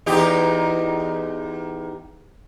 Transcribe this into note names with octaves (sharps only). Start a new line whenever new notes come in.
E2 D#4 G4